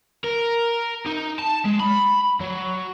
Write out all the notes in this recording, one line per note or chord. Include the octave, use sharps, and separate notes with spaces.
A#4
D#4
A5
G#3
B5
F#3